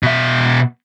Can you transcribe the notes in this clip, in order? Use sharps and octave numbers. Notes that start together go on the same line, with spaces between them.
B2 E5